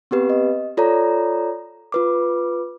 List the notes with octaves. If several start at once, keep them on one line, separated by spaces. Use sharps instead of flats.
B3 C4 G4 B4
D#5
F4 A4 C#5 D5 A#5
F4 B4 D6